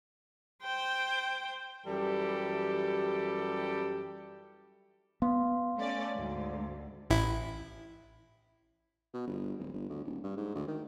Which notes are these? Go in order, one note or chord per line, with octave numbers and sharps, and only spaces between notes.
C5 G5
F#2 E3 G3 G4 A4
B3 F5 C6
A3 C#4 D5
D2 G#2
A1 E4
B2
G1
D1
G1
D2
D#1
G2
G#2
D2
D#3